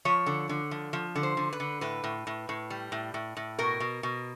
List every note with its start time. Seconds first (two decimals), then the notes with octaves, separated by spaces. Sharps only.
0.05 F3 C#5
0.26 D3
0.49 D3
0.71 F3
0.93 F3
1.16 D3
1.23 C5
1.37 D3
1.53 B4
1.60 D3
1.81 A2 B4
2.04 A2
2.27 A2
2.49 A2
2.70 G3
2.92 A2
3.14 A2
3.37 A2
3.59 B2 A#4
3.80 B2
4.03 B2